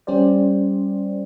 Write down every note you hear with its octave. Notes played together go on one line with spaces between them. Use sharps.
G3 C#4 G4 C5 D5